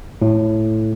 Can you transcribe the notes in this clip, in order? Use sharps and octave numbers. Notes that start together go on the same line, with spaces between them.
A2